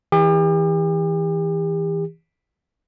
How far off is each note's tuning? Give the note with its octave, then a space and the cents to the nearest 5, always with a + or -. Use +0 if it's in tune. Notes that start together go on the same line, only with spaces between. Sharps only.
E3 -25 G4 +40